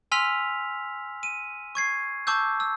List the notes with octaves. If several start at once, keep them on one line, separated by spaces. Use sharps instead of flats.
G#5 C6 E6 F6 B6 F7
D#7
C#6 G#6 C7
A5 C#6 D6 E6 G6
E6